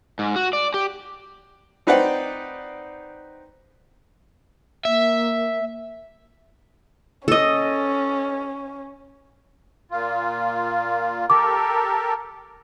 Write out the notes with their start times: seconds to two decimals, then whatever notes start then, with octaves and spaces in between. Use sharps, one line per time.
0.19 G#2
0.36 F#4
0.53 D5
0.74 G4
1.87 C4 D#4 B4 C5 D5 F#5
4.85 A#3 E5
7.28 C#4 A4 D#5
9.91 A#2 F4
11.30 G4 A4 A#4 D6